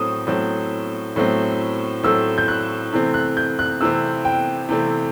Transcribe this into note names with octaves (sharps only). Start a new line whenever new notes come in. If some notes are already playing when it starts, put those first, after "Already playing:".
Already playing: A2 F#3 A3 C4 D#6
A2 F#3 A3 C4
A2 F#3 A3 C4
A2 F#3 A3 C4 E6
G6
F#6
C3 E3 A3 C4
F#6
G6
F#6
C3 E3 A3 C4 E6
G5
C3 E3 A3 C4